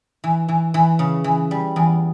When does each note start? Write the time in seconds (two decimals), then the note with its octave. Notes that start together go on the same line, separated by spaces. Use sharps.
0.24 E3
0.48 E3
0.74 E3
0.99 C#3
1.24 E3
1.51 G3
1.76 E2